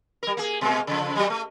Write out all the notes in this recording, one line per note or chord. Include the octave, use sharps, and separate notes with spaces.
G3 A#4
A#3 G#4
B2 G#3 A#3
C#3 F3
F#3 G3
A3